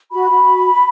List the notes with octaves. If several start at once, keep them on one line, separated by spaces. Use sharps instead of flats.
F#4 B5
F#4